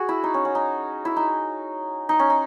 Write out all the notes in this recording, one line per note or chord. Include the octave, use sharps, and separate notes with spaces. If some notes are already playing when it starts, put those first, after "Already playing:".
Already playing: F#4 G#4
E4
D#4
C#4
C#4
D#4
E4
D#4
D#4
C#4
D#4